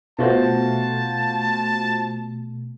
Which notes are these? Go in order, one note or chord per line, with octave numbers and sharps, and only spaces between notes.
B2 A3 F4 F#4 C5 A5